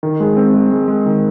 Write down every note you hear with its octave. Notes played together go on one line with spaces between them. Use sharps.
D#3
G#3
C4
G#3
G#3
G#3
D#3